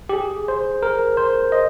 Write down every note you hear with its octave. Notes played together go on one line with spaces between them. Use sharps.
G4
G#4
C5
A#4
C5
D#5